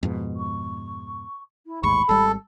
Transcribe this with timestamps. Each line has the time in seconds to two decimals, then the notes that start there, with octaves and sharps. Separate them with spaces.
0.03 F2 G#2 B2
0.36 C#6
1.66 E4
1.83 A1 D#2 G#2 B5 C#6
2.09 G#1 G3 A4